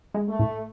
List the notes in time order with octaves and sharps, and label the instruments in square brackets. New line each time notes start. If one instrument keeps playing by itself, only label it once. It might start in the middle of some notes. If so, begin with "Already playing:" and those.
[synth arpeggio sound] G#3
[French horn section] A3
[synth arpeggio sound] A2